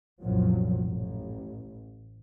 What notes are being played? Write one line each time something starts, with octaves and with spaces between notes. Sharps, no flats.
C2 F#2 A#2 F3 F#3
A1